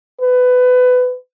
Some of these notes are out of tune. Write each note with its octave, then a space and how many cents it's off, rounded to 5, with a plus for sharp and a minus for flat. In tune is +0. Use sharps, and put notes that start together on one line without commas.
B4 +20